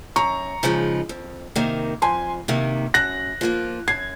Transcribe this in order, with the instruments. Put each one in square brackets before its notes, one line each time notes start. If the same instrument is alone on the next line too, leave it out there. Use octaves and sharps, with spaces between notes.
[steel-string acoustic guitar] F#2 [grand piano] A#5 C#6
[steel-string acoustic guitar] C#3 F3 G#3 D#4
F2
C3 D#3 A#3
[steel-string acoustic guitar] F2 [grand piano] G#5 C6
[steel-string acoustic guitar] C3 D#3 A#3
[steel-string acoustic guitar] F#2 [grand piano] F#6 A#6
[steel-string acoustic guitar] F3 A#3 F4
[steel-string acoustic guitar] F#2 [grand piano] G#6 C7